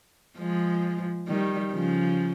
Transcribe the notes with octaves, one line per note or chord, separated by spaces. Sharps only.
F3 G#3
D#3 G3
C#3 F3